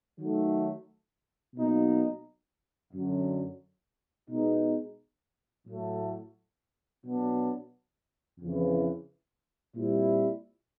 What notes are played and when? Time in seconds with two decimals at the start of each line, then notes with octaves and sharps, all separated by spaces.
0.19 D#3 F#3 A3
1.56 B2 F#3 A#3 D#4
2.92 F#2 D3 F#3
4.28 B2 G#3 B3 D#4
5.66 A2 F#3 A3
7.02 B2 F#3 B3 D4
8.39 F2 C#3 E3
9.75 A#2 G3 C4 E4